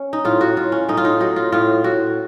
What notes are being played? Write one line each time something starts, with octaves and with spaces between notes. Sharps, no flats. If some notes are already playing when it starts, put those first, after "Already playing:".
Already playing: C#4
D#4
A2 F4
F#4
A2 F4
C#4
A2 D#4
F4
D#4
F#3 D#4
F4
A2 F4
A2 F#4